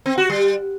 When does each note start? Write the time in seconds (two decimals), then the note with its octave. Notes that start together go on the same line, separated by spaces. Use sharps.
0.06 C4
0.18 F#4
0.30 G3